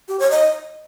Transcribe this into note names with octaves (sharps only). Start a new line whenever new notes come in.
G4
C#5
D#5